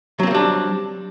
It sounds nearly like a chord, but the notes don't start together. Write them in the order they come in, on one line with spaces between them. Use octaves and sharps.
F#3 C4 A#3 G3 D4